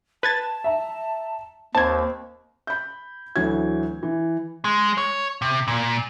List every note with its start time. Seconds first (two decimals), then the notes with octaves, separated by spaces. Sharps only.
0.23 B4 A5 G#6 A6
0.64 E5 A#5
1.75 D#2 C4 A5 G#6
2.67 B5 G6
3.36 D2 E3 F#3 G#6
4.03 E3
4.65 G#3
4.98 C#5
5.42 C3
5.68 A#2